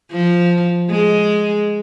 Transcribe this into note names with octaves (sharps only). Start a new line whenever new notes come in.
F3
G#3